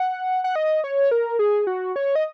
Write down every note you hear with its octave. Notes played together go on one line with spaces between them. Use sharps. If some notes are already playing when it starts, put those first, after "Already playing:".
Already playing: F#5
F#5
D#5
C#5
A#4
G#4
F#4
C#5
D#5